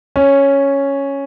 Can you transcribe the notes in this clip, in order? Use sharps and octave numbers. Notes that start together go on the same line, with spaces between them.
C#4